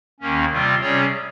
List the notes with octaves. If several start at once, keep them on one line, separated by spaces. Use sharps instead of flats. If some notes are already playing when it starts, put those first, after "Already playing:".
D#2 D#3 A#3 C#4
C3 G3 C4 F4
C3 G3 C#4 G#4 C#5